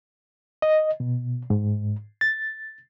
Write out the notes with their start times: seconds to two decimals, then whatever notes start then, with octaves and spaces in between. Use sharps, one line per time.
0.62 D#5
1.00 B2
1.50 G#2
2.21 A6